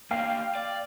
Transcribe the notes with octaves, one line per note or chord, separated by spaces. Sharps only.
E2 A#3 F5 G5 C7
D5